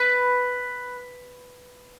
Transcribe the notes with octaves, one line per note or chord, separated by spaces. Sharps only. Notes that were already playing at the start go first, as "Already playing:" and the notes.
Already playing: B4